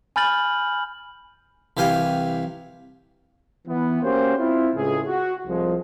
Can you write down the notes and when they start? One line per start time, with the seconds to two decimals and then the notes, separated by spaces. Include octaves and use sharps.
0.16 G#5 B5 F6 G6 A6 F#7
1.77 C2 E3 G4 F5 G#5
3.67 E3 B3
4.03 A#3 C#4 F#4 G4 C5
4.37 C4 E4 F4
4.75 C#2 A2 G#4
5.08 F#4
5.47 C2 F3 G#3